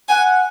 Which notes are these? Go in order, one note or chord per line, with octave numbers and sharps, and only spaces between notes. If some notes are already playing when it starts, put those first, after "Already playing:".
F#5 G#5